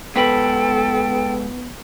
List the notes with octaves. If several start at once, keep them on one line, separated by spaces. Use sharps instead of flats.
G#2 B3 A4 B4 G5 B5